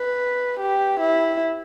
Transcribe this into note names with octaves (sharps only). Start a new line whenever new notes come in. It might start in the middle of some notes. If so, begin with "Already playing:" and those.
Already playing: B4
G4
E4